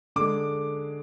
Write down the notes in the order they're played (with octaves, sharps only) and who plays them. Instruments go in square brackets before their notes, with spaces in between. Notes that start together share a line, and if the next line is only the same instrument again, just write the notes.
[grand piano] D3 G#3 D6